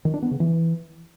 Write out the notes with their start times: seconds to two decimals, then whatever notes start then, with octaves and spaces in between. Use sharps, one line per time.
0.05 D#3
0.14 D4
0.22 B3
0.31 C#3
0.40 E3